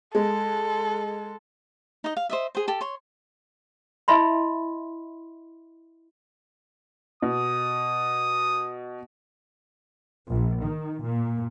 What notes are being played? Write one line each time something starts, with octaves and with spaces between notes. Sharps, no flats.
G#3 A4
D#4 D#5
F5
C5 D#5 E5
G#4 C5
G4 A4
C#5 C6
E4 D#5 E5 B5 C6
B2 D#6
A#1
D#3
A#2